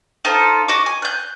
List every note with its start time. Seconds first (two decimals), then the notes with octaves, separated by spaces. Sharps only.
0.25 D#4 F4 A4 C5
0.68 F#4 D#5 D6
0.86 G#5
1.02 F#6 G6